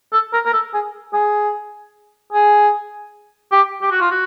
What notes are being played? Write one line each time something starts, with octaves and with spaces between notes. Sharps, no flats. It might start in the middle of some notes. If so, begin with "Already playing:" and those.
A4
A#4
A#4
A4
G#4
G#4
G#4
G4
G4
F#4
F4
F#4